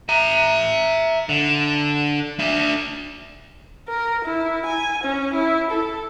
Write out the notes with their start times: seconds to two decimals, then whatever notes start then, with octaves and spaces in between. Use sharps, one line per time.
0.09 E5 A#5
1.29 D3
2.39 D4 E5
3.88 A#4
4.25 E4
4.66 G#5
5.04 C#4
5.33 E4
5.70 A4